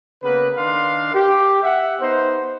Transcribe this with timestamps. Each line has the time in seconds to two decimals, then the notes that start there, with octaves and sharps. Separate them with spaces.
0.23 C#3 A#3 B3 B4
0.57 D#3 D4 A#4 F5 C6
1.14 G4
1.62 E5 F#5
2.00 B3 D#4 C5